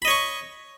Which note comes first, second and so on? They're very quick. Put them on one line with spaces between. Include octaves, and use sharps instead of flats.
B5 D#5 C#5 C#6